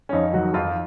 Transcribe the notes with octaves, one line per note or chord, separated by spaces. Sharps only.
C#4
F2 D#4
D#3 F#3 F#4
F2 F3 F4